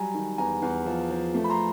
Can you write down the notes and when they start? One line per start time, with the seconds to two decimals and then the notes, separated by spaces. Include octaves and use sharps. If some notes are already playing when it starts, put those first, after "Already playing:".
Already playing: F#3 G3 G#5 A#5
0.14 D#3
0.38 E2 G#5 A#5
0.62 E2
0.86 F3
1.11 F3
1.34 A3
1.44 B5
1.50 A#5 C6